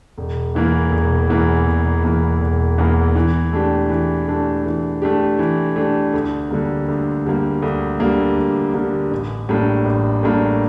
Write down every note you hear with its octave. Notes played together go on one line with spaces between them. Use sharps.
E1
E2 E3 A#3
E1
E2 E3 A#3
E1
E2 E3 A#3
E1
E2 E3 A#3
E3
A3 D4 G4
E3
A3 D4 G4
E3
A3 D4 G4
E3
A3 D4 G4
D2
D3 G3 A#3
D2
D3 G3 A#3
D2
D3 G3 A#3
D2
D3 G3 A#3
A1
A2 G3 A#3 D4
A1
A2 G3 A#3 D4